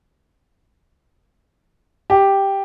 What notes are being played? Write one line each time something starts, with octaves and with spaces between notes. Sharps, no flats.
G4